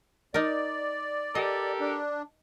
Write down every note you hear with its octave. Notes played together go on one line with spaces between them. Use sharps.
D#4 A#4 D5
G4 A4 A#4 D#5
D4